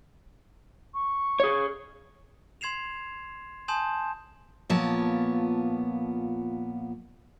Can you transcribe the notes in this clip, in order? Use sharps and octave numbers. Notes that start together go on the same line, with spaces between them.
C#6
G#4 C#5
C6 G#6 C7 E7 F7
G#5 A5 C6 D#6 G6 E7
A#2 F3 B3 C#5 A5